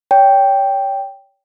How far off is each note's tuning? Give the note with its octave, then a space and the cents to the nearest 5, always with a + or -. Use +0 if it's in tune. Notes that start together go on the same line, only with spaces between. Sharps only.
C#5 +30 G5 +0